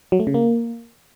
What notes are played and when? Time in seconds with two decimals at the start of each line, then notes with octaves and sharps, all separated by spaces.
0.12 F#3
0.20 A3
0.27 C#3
0.34 A#3